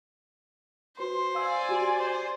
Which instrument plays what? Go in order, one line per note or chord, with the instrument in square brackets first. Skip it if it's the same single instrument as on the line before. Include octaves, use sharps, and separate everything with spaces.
[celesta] F#4 B4 C6 [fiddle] C5
[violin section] D5 G#5 [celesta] F5 E6
[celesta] F#4 G4 C6
[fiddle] C5